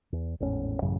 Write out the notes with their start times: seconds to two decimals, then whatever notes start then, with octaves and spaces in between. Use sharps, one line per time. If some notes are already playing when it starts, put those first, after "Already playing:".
0.12 E2
0.40 G#1 E2 A2 C#4
0.82 A1 F#2 C#3